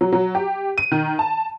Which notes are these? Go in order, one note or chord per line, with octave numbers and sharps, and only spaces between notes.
F#3
F#3
G4
D#7
D#3
A5